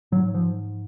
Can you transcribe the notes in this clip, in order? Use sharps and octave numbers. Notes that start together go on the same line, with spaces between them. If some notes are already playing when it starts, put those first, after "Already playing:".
G#2 F#3
F3